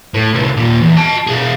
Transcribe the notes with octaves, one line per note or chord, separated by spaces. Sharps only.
A2
C2 D#3
D#2 A#2
E2
D#5 A5
B2 G#4